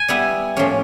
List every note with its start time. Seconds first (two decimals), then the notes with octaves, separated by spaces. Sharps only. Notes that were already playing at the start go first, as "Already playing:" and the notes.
Already playing: G#5
0.08 G3 B3 E4
0.57 A2 F3 A#3 C#4